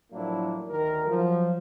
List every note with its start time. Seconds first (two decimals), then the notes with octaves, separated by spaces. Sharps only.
0.12 A2 F3 F#3 A#3 D4 E4
0.69 D2 D#3 A#4
1.07 F3 F#3